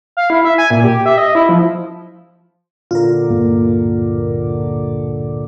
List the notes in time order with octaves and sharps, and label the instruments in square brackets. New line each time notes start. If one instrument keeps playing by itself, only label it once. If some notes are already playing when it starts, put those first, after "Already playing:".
[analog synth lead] F5
E4
E5
G#5
A#2
G4
E5
D#5
E4
F3
[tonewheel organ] A#2 D3 [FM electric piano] F4 A#4
[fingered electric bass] D1 G2 A#3